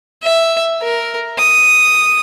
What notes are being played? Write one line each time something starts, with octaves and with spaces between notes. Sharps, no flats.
E5
A#4
D#6